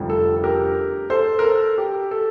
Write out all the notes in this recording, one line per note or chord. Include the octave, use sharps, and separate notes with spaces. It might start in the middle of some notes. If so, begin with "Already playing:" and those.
Already playing: F1 F2 D3 G3
A4
A4
G4 A#4
A4 C5
A#4
A4
G4
A4